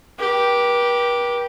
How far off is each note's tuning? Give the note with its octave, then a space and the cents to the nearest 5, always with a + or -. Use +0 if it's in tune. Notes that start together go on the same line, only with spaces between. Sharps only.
G4 -5 B4 -45